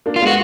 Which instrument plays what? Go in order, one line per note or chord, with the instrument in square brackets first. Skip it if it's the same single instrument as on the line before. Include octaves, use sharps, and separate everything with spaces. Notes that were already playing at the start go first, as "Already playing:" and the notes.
[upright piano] A#3 D4
[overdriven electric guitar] F4
[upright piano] G#3 B3
[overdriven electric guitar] F#4